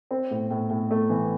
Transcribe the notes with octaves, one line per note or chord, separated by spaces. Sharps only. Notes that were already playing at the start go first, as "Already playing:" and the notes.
C4
A2
A2
A2
A3
E3